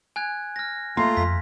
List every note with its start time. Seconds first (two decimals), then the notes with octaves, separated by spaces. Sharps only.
0.16 G#5 F#6 G#6
0.56 F6 A#6
0.97 A3 A#3 F4 A#5 C6
1.17 F2 B6